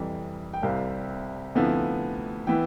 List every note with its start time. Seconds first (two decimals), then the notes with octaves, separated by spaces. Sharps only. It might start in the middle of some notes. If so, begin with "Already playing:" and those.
Already playing: F2 C3 E3 G3
0.53 G5
0.63 C2 C3 G3 C4 F5
1.55 D2 C3 F3 B3 E4
2.47 E3 B3 E4 G5